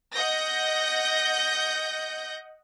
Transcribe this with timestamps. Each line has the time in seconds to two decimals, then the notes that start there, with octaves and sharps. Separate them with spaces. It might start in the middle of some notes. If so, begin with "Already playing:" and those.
0.14 D#5 F#5 G6 A#6